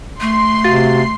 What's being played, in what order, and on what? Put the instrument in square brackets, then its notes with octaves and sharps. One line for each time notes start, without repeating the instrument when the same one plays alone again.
[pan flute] A3 [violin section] C6
[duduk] C3 [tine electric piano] F#4 F5 A6